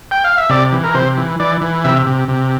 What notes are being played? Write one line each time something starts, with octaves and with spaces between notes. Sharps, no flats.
G5
F5
E5
C3 D5
E3
A#4
C3 C5
E3
E3 D5
E3
C3 E5
C3
C3